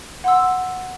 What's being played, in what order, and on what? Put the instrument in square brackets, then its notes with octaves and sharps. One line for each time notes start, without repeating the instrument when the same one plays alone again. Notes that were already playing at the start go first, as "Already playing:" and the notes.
[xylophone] F#5 C6 E6